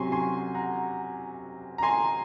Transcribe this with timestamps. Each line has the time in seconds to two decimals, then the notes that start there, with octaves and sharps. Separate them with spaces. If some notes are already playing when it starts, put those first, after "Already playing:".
Already playing: C3 F#3 C#4 G#5 C6 C#6
0.12 G#5 C6
0.55 F#5 A#5
1.78 A#5
1.83 G#5 C6